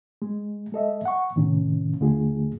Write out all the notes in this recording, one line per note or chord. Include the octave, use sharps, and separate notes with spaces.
G#3
G#3 A4 D#5 E5
F#5 C#6
A2 C3 D#3 C#4
D#2 D3 A3 F4 G#4